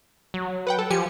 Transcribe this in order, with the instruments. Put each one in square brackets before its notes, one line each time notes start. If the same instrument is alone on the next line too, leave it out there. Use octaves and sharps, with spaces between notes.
[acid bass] F#3
[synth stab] B4 F#5 G5
A4
[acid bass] F3 [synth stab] G4 G#5 C#7